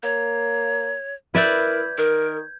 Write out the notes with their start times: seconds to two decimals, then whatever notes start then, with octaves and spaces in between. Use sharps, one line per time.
0.03 A#3 C#5
1.35 E4 A#4 B4 D5 E5 G6 G#6
1.98 D#3 A#4